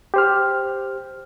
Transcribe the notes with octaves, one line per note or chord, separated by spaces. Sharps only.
G4 C5 F6